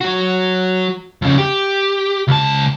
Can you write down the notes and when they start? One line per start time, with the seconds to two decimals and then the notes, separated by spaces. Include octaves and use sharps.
0.01 F#3 F#4
1.22 F2 C#3
1.38 G4
2.28 C#2 A5